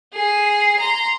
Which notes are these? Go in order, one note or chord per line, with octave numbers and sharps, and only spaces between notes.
G#4 C7
A#5 C6